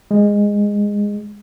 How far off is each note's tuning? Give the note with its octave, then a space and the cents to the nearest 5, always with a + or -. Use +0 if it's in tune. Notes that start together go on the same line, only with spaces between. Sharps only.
G#3 -15